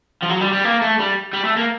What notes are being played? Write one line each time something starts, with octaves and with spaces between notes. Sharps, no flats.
F3
F#3
G3
G3
A#3
A3
G3
G3
A3
A#3